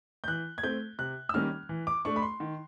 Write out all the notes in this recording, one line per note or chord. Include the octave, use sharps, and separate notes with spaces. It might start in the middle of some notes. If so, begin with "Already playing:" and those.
G6
E3 F#6
G#6
A3 C4 G6
C3 F#6
E6
D#3 G3 A#3 C#4 F6
E3
D6
A3 D4 C#6
B5
C6
D#3